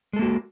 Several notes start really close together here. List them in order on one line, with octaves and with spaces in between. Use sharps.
G#3 A4 A#3 F#4